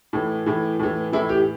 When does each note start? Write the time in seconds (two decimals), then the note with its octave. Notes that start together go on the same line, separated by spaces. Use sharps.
0.13 A2 E3
0.46 A2 E3
0.79 A2 E3
1.13 A2 E3 E4
1.29 G4